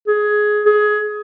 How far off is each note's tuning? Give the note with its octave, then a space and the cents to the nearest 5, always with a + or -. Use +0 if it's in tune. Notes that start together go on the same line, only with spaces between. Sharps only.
G#4 +15
G#4 +20